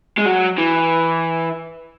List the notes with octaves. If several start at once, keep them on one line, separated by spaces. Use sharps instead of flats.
G#3
F#3
E3